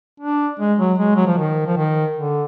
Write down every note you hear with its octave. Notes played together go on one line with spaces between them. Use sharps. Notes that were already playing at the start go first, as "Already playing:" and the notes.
D4
G#3
F#3
G#3
F#3
F3
D#3
F3
D#3
D3